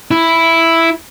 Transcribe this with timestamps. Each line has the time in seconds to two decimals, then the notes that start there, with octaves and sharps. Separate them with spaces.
0.11 E4